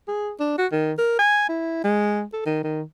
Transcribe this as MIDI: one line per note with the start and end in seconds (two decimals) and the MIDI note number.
0.08 0.31 68
0.40 0.56 62
0.58 0.66 66
0.72 0.93 51
0.98 1.17 70
1.19 1.48 80
1.49 1.84 64
1.84 2.23 56
2.33 2.41 69
2.46 2.61 51
2.63 2.83 51